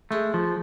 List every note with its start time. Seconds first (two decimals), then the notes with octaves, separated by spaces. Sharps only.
0.11 G#3 A3
0.34 F3